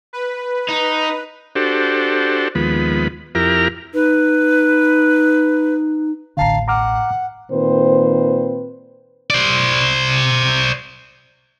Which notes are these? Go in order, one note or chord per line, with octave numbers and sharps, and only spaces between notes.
B4
D#4
D4 F#4 G4 A4 C5
D#2 F3 G#3 B3 B5
F2 E4 G4 A#4 A#5 F6
D#4 B4
E1 A1 D3 F5 A5 A#5
F#5 A#5 D6 F6
A#2 D#3 C4 B4 C5
C5 D5